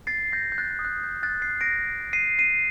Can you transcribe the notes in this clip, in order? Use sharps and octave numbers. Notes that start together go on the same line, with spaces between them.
A6 C7
G6 A#6
G6
F#6 A6
D#6
F#6
G6
F#6 A6
A6 C7
A#6 D7
C7 D#7
C7 D#7